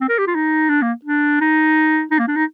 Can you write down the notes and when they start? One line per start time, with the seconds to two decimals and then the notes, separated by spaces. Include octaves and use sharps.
0.01 C4
0.09 A#4
0.18 G4
0.27 F4
0.35 D#4
0.70 D4
0.82 A#3
1.05 D4
1.41 D#4
2.11 D#4
2.19 A#3
2.28 D4
2.36 D#4